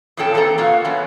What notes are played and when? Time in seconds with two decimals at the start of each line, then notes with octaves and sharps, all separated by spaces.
0.17 F2 A#2 F3 C#4 A4 G5
0.34 E3 A#3 C4 A4 A#5
0.58 B2 A#3 F4 F#4 F5
0.85 E3 F#3 B3 C#4